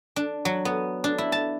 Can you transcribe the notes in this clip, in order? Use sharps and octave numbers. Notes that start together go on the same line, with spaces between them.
D4
F#3
B3
D4
E4
A5